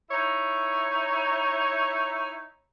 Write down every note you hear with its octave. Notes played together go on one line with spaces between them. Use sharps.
D#4 E4 C#5